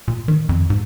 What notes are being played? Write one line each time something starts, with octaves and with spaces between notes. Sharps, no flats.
A#2
D#3
F2
G#2